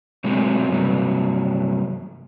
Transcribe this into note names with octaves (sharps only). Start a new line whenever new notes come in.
B2 F#3 G#3 A3 C4
G2 C3 F#3